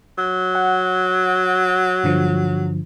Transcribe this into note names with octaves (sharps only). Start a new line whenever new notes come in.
F#3
F#5
G2 D3 F3